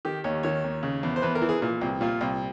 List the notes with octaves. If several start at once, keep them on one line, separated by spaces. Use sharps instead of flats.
D#3 G4
D#2 C#5
D#3 C#5
D#2
C#3
E2
C5
E2 B4
A#4
E3
G#4
A#2
C2
A#2 F4
C2